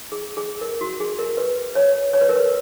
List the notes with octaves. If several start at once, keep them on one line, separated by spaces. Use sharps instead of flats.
G#4
G#4
A#4
F#4
G#4
A#4
B4
C#5
C#5
B4
A#4
B4